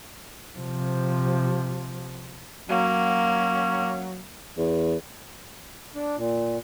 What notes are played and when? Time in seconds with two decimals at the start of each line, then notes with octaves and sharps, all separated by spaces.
0.58 C3 F3
2.69 F#3 A#3 C#4
4.58 E2
5.95 D4
6.17 A#2